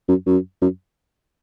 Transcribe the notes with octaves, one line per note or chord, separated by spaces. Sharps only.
F#2
F#2
F#2